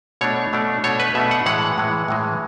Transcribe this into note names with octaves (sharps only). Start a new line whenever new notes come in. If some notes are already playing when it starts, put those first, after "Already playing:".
B2 A3 D4 C#5
B2 A3 D4
B2 A3 D4 C#5
B4
B2 A3 D4 E5
F#5
A2 E3 G#3 F#5
A2 E3 G#3
A2 E3 G#3